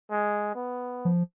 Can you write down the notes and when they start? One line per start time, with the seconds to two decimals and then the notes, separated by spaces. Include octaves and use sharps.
0.11 G#3
0.55 B3
1.05 F3